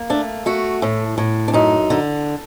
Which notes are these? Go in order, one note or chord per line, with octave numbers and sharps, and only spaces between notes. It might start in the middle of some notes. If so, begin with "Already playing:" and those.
Already playing: A#3
A3 D4
A3 F#4
A2
A2
D4
F#2 D#4
D3